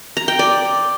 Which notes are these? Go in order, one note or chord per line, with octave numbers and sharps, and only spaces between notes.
A#5
G5
D5